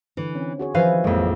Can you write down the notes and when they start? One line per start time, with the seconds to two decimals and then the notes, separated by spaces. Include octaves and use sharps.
0.17 D3 E3
0.35 C4 C#4
0.59 F#4 G#4 C#5
0.74 E3 F3 B4 C5 F5 G#5
1.04 A1 F2 G#3 A#3